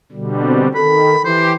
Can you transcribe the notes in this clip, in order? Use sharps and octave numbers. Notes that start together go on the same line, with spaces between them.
B2 D3 G3
C4
D#3 A4 B5
E3 G4 C5